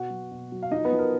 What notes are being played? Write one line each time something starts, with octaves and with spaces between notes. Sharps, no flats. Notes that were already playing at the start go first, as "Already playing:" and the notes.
Already playing: B2 F#4 F#5
F#3
B2
F#3
F5
F3 D#4 D#5
B3 B4
F3
A#4